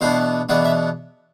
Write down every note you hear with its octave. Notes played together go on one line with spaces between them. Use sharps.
E2 B2 B3 D4 C5
E2 B2 B3 D4 D5
E5